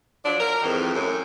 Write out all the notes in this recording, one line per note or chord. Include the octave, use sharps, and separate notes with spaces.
F3 F#3 D4
A#4
F2 G#2 D#3 E3
F#2 A2